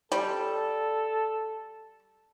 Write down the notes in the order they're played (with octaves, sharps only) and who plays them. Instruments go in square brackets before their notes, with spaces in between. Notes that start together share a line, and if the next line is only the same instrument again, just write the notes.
[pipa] G3 [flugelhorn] A4